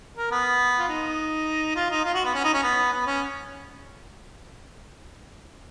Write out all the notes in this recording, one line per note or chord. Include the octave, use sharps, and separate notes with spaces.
A#4
B3
F4
D#4
F4
D#4
F4
F#4
B3
C#4
D#4
C#4
B3
B3
C#4